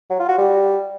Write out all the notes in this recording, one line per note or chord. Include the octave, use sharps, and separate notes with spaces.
F#3
F4
F#4
G3